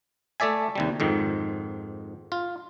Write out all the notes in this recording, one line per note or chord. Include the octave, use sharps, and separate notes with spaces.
A3 A4 D5 E5 G#5
D#2 C3 G3
F2 G#2 D#3
F4